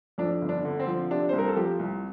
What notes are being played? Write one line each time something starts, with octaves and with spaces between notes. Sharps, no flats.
F2 D4
G1
D4
D3
C4
F3
C3 D4
C2 C5
A#4
A4
F3 G4
C2